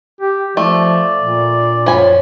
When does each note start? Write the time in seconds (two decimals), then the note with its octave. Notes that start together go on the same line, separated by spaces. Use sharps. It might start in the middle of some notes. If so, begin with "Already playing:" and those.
0.21 G4
0.57 F3 A3 D5
1.19 A#2
1.61 D4
1.86 F#2 F3 C#5 G#5 B5